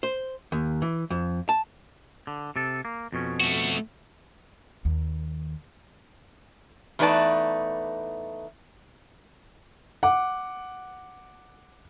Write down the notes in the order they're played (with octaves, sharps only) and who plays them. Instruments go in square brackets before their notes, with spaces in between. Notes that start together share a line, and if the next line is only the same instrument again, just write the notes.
[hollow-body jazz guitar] C5
D#2
E3
F2
A5
[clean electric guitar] D3
C3 A4
A#3
F2 B2 C#4
[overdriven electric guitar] A3 F#4
[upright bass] D#2
[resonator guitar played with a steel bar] E2 A3 D#4 B4 D5 A5
[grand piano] F#5 D6